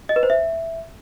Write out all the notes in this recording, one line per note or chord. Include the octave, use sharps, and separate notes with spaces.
D#5
B4
C5
E5